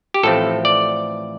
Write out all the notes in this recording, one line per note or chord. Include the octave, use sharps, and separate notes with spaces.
G4
A1 A2 F3 A3 C4 A4
D5